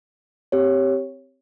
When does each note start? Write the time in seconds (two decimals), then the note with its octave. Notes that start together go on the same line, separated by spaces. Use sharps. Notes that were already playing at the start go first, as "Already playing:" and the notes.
0.52 C4 G4 C#5